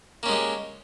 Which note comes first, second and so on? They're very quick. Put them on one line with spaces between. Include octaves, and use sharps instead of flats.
A#3 C#4 G#3 G4